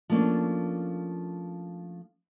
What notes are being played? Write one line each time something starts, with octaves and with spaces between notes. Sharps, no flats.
F3 A3 A#3 C#4 D4